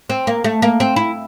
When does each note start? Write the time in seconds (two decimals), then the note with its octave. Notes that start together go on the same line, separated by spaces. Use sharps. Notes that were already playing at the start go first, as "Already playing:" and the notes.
0.10 C4
0.27 A#3
0.44 A3
0.62 A#3
0.80 C4
0.96 E4